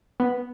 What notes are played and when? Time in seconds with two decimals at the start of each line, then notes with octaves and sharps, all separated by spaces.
0.20 B3